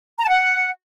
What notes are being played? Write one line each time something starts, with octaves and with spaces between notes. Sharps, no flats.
A#5
A5
F#5